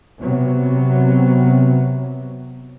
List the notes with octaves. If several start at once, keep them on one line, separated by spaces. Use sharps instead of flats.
C3 F#3 B3